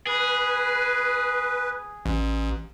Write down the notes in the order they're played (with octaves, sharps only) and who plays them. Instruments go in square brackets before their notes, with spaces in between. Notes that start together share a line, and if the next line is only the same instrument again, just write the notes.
[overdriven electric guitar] G#4 [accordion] B4
[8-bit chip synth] A1